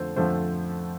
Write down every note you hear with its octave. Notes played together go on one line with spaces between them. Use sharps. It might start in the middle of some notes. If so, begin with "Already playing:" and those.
Already playing: F2 D3 F3 A3 A4 C5
F2 D3 F3 A3 C5